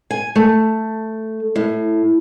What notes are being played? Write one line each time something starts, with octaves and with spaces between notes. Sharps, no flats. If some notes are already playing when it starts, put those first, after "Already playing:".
G#5
A3
A2